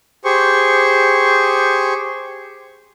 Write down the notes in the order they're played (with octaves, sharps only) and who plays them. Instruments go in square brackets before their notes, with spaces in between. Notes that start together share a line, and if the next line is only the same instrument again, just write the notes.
[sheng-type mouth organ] G4 G#4 C5 C#6